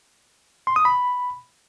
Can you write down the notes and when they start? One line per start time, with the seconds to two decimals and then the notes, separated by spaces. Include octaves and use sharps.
0.67 C6
0.76 D#6
0.85 B5